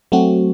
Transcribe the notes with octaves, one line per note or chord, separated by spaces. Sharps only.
F#3 A3 C4 F#4